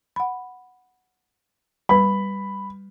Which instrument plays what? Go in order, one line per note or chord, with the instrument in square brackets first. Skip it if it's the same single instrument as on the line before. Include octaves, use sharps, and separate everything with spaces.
[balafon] F#5 B5
[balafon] G3 B4 [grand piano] B5